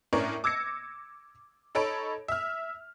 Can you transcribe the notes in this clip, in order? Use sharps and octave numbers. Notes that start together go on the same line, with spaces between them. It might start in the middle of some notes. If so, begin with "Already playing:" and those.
A2 C#4 D4 A#4 C#6
D6 E6 G#6 A#6 C#7
D#4 A4 C#5 B5 D7
E5 F6